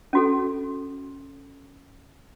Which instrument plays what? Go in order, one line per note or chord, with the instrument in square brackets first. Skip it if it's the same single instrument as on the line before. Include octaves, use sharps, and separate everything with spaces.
[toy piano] C#4 F#4 A4